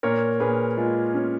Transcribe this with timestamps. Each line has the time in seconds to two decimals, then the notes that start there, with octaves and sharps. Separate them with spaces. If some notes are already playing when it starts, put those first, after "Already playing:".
0.03 A#2 A#4 C#5
0.40 A#2 G#4 B4
0.77 G#3 F4
1.14 C#4